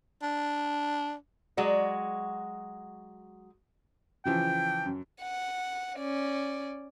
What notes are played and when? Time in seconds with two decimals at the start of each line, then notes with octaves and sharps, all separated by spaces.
0.22 D4
1.57 F#3 G#3 F#4 D5
4.25 C#3 E3 F3 G5
4.86 F#2
5.22 F#5
5.98 C#4 D5